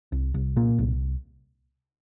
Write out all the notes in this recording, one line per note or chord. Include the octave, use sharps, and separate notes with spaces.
C2
C2
A#2 A#3
C2